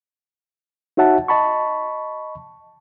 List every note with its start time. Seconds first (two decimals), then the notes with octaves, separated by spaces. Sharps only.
0.97 D#4 F#4 C#5 E5 F#5 A5
1.28 D#5 A5 B5 C#6